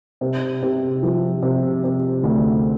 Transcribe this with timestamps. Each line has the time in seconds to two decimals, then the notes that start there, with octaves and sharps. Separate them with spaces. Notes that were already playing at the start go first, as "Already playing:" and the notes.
0.21 C3
0.62 C3
1.03 F3
1.42 C3
1.84 C3
2.23 D2